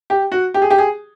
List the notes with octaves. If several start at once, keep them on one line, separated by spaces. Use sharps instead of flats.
G4
F#4
G4
G#4
G4
G#4